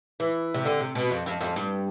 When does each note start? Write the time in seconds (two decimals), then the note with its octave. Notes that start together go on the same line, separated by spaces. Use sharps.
0.20 E3
0.54 C3
0.65 D3
0.80 C3
0.95 B2
1.11 F2
1.26 F2
1.41 F2
1.56 G2